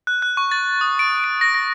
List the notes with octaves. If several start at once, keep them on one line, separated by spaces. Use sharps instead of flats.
F#6
F#6
C#6
A6
D#6
D7
D7
A#6
A#6